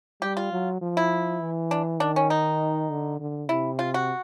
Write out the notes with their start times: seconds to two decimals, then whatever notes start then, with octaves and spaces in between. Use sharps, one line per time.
0.22 G3 G4
0.37 F4
0.52 F#3
0.82 F3
0.97 E4
1.41 E3
1.71 D4
2.00 D#3 D4
2.16 C#4
2.30 D#4
2.90 D3
3.20 D3
3.49 C3 E4
3.79 F4
3.94 F#4